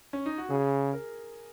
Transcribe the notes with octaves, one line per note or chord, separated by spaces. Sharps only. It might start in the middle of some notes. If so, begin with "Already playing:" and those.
C#4
D#4
F#4
C#3 G#4
A#4